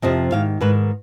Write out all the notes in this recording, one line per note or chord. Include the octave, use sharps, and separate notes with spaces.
F2 C3 F3 D#5
G#2 D#3 F5
G#2 D#3 B4